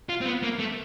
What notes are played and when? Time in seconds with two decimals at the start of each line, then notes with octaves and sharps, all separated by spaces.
0.09 F4
0.21 C4
0.26 B3
0.43 A#3
0.59 A3